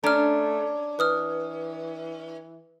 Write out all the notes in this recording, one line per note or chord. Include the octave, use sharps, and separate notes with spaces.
A3 C#4 D4 A#5 F6
E3 B4 D#6 F6